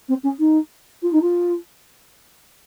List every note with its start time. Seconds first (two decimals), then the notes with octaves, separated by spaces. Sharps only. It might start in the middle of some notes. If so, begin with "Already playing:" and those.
0.08 C4
0.23 C#4
0.39 D#4
1.02 F4
1.12 D#4
1.22 F4